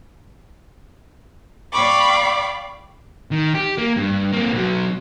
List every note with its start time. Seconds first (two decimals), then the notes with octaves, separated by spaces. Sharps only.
1.73 D5 F5 G5 B5 C#6 D6
3.31 D#3
3.54 G4
3.78 A#3
3.97 G2
4.32 A#3 C4
4.54 B2 F#3